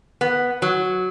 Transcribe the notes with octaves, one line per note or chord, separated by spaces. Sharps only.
B3
F#3